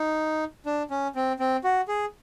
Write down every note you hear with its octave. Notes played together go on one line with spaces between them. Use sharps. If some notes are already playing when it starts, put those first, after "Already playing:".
Already playing: D#4
D4
C#4
C4
C4
F#4
G#4